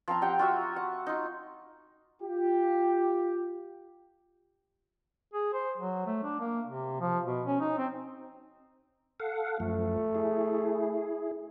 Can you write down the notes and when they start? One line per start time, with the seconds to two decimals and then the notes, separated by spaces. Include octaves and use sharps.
0.08 F3 C4 A#5
0.22 G4 F#5 G5
0.39 F4 F#4 E5
0.76 F#5
1.07 D#4 F4
2.23 F4 G4
5.34 G#4
5.54 C5
5.78 F#3
6.06 A3
6.23 D4
6.40 A#3
6.66 C3
7.00 F3
7.25 B2
7.46 C#4
7.60 D#4
7.78 C4
9.20 A4 F5 F#5
9.60 F#2 F3 A3
10.15 E4 G#4